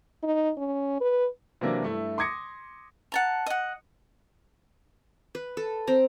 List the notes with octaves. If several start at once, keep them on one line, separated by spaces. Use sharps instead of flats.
D#4
C#4
B4
C3 E3 F#3 A#3 D4 E4
G2 A3 E4
C6 D6 D#6 G#6 A#6 C#7
F#5 A5 A#5
D#5 F#5
B4
A4
C4 A#5